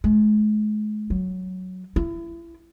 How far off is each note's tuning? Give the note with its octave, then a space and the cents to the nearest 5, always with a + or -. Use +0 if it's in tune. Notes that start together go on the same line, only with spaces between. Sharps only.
G#3 +40
F#3 +0
E4 +30